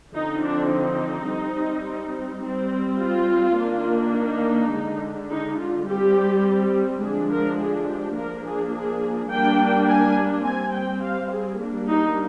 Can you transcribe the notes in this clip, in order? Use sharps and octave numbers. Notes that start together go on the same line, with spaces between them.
D3 F3 C4 D#4
D4
D#4
G3 C4
G3 C4
F4
D#3 A#3 D4
D#4
D3 G#3 D4
D#4
F4
G3 C4 G4
D3 F3 G#3 D4 G#4
A#4
G#4
G4
F3 A#3 D4 A#4
G#4
G#4
G3 A#3 D4 G5
G#5
G3 C4 G#5
G5
F5
G#4
G3 A#3 D4
D#4